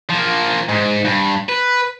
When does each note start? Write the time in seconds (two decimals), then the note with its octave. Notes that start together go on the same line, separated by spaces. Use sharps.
0.09 F3 A#3
0.69 G#2
1.05 G2
1.49 B4